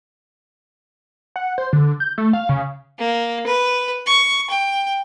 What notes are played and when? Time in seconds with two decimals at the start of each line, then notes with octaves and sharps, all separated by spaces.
1.36 F#5
1.58 C5
1.73 D3
2.00 G6
2.18 A3
2.33 F5
2.49 C#3
2.99 A#3
3.47 B4
4.06 C#6
4.50 G5